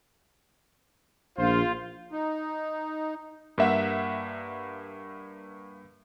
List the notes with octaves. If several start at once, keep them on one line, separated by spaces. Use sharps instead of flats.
A#1 F4 C5
D#4
G2 A#3 E5 F#5